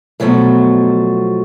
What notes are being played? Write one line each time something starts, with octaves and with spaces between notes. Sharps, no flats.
B2 F3 F#3 A3